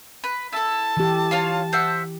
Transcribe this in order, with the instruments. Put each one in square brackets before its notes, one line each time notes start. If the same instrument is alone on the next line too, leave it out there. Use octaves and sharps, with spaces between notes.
[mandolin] B4
[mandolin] E4 A4 [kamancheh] A5
[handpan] E3 G4
[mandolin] F4 C#5 F5
C5 E5 F#5